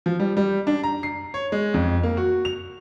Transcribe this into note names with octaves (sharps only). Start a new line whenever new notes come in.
F3
G3
G3
D4
A#5
C7
C#5
G#3
F2
A#3
F#4
F7